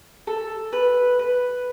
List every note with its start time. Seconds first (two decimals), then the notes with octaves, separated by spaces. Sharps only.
0.27 A4
0.73 B4
1.19 B4